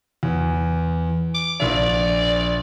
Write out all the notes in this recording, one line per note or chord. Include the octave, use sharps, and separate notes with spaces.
E2
D6
A#1 D5 E5